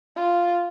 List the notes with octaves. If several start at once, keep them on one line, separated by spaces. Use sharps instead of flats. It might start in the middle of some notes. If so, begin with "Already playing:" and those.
F4